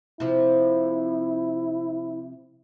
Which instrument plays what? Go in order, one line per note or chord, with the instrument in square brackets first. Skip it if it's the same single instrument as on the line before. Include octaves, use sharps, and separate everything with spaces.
[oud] C3 F3 [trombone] E4